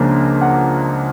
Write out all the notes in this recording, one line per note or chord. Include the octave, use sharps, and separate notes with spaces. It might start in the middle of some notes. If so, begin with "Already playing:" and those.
Already playing: C#2 C#3 F3 A#3 D4
F#5